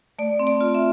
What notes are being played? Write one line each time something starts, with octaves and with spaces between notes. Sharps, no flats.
A3 D5
C4
D5
F4
E5